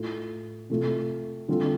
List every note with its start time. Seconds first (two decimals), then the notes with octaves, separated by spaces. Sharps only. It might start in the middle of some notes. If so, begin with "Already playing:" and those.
Already playing: A2 A3 F4
0.70 C3 A3 F4 A4
1.48 D3 G3 C4 F4 A4